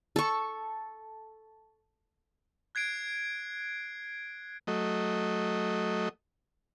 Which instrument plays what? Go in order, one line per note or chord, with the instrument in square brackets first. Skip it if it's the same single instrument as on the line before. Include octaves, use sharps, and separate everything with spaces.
[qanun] A4 C#6
[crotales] F#6 G#6 C7 D7
[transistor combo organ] F#3 A3 D#5